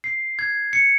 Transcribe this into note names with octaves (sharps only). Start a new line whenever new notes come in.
C7
G#6
C#7